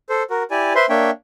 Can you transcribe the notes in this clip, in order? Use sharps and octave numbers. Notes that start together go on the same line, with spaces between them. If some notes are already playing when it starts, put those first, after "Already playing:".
A4 C5
F#4 A#4
E4 G4 D5 G#5
B4 C5 E5 C6
A#3 D4 C#5 E5 G5